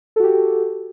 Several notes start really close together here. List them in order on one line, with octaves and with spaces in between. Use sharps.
A4 F#4 G4